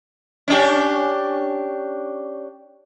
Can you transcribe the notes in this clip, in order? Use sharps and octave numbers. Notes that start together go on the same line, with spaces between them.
C#4 D4 G4